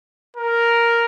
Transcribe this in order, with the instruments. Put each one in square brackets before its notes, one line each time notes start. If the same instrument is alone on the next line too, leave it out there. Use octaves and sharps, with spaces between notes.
[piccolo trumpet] A#4